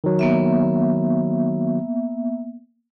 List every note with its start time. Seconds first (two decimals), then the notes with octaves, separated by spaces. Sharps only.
0.04 D#3 F#3
0.19 A#3 B3 E5